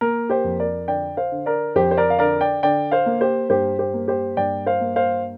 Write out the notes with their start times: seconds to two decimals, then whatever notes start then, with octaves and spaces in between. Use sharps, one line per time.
0.01 A#3 A#4
0.30 G4 C5
0.44 F2
0.59 A#4 D5
0.88 D3 D5 G5
1.17 C5 F5
1.32 D3
1.46 A#4 D5
1.75 F2 G4 C5
1.91 C5
1.97 A#4 D5
2.10 F5
2.19 D3 A#4 D5
2.41 D5 G5
2.63 D3 D5 G5
2.91 C5 F5
3.06 A#3
3.21 G4 C5
3.49 G2 G4 C5
3.79 G4 C5
3.94 A#3
4.08 G4 C5
4.37 G2 D5 G5
4.66 C5 F5
4.81 A#3
4.96 C5 F5